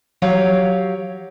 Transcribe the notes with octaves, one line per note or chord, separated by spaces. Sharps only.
F#3 G4 C#5 F5